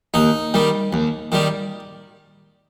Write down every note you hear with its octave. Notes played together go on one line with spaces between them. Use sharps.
D#2 D#4
D#3 G3
D#2
D#3 G3